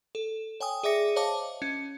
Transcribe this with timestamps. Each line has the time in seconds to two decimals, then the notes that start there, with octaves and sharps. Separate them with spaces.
0.15 A4
0.60 C#5 G5 G#5 D#6
0.83 G#4 D5 E5 D6 A#6 C#7
1.16 C5 C#5 D#5 F5 A5 D6
1.62 C#4